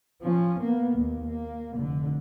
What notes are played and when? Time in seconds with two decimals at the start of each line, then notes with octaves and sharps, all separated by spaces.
0.22 F3 C#4
0.61 A#3 B3
0.97 D#2 A#3
1.28 A#3
1.76 F1 D3